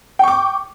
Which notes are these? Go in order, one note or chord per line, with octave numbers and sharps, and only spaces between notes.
G5 C#6 D6